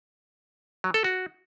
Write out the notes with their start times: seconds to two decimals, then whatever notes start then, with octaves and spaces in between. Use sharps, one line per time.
0.84 F#3
0.94 A4
1.04 F#4